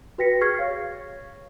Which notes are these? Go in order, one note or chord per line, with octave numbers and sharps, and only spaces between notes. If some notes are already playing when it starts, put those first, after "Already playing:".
F#4 B4 G5 A#6 B6 C#7
G#4 C#6 F6 G#6 C7
C#5 F5 A6